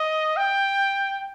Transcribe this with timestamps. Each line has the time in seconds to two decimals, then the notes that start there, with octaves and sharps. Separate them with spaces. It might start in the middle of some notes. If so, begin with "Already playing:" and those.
Already playing: D#5
0.37 G5